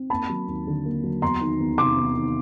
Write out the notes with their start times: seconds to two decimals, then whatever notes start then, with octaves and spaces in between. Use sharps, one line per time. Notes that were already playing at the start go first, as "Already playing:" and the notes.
Already playing: C4
0.10 A#3 A5 B5
0.29 F#3
0.48 D#2
0.67 D3
0.86 A#3
1.04 F#3
1.22 E2 A#5 C6
1.41 D#3
1.59 E2
1.78 C3 C6 D6
1.97 E2
2.15 D#3